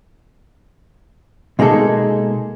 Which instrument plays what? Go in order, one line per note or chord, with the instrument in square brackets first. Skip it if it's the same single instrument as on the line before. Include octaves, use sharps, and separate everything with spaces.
[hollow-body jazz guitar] B2 G#3 A#3 D#4 G#4 A4